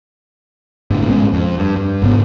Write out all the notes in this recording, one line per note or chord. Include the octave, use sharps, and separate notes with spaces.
G1 A2 D3
G#1 B2 G#3 C#4
F2
G2
G2
G#1 G#2 C#3 B3